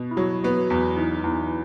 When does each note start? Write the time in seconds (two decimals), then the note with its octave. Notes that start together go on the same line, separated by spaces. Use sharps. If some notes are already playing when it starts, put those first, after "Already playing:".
Already playing: B2 B3
0.11 E4
0.16 F#3 F#4
0.44 B3 F#4
0.59 F#4
0.70 E2 E4
0.97 E3 D#4
1.15 D#4
1.24 E2 E4